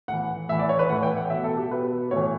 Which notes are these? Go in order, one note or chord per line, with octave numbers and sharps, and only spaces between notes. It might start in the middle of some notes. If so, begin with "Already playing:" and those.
A2 E3 F#5
A2 E3 E5
D5
C#5
B4
A2 E3 F#5
G5
F#5
B2 E5
A4
G4
B2 B4
A2 E3 C#5